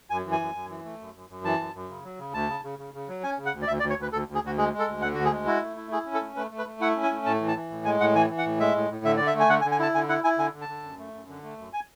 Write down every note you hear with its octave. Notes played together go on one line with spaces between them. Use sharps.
F#2 G#5
E3
G#5
F#2
F#2
E3
A3
F#2
F#2
F#2
E3 A5
F#2
F#2
C#3
F#3
C#3
D2 A5
C#3
C#3
C#3
C#3
F#3
C#4 G#5
C#3
F#5
D2
D5
D2 E5
D5
D2
C#5
D2 B4
D2 A4
D2
G#4
D2 F#4
G#3 G#4
G#3
A4
D2
D3 F#5
D2 F#4
G#4
G#3
E4 F#4
A3
E4
E4 G#4
C#4
A4
A3
A3 B4
A3
B4
A3
E4 F#5
C#4
G#5
A3
A2 A5
E3
A5
E3
A2
G#3 G#5
A2 F#5
E3 G#5
E3
F#5
A2
G#3 E5
A2
A2
D3 E5
D3 D5
E5
A3
G#5
D3 F#5
G#5
D3
G#5
E4 A5
D3 G#5
E4 F#5
E4 G#5
D3 G#5
D3
A5
D3
F#2
A3
F#2
D3
A3
F#2
G#5